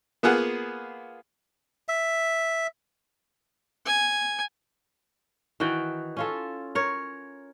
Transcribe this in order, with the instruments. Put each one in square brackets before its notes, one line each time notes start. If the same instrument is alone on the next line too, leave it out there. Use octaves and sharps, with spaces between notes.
[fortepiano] A#3 B3 F4 G#4 F#5
[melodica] E5
[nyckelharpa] G#5
[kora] D#3 E3 F#4 G5
C#4 F4 A4
A#4 C#5